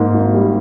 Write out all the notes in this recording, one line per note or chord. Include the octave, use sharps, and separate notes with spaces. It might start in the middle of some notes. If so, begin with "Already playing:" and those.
Already playing: G#2 A#3
G#1
G3